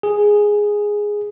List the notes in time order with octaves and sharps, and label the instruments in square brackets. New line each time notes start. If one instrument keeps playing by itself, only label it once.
[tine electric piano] G#4